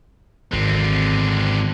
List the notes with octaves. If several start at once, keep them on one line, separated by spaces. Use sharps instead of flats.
G#1 D3 C4